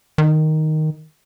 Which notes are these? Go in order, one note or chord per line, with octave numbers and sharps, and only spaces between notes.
D#3